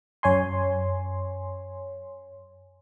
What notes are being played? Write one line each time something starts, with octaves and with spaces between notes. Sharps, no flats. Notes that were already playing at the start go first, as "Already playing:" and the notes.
F#2 C#5 G#5 C6